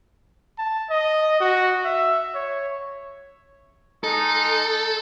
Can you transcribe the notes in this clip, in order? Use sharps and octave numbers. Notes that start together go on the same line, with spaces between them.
A5
D#5
F#4
E5
C#5
G#3 D#4 A4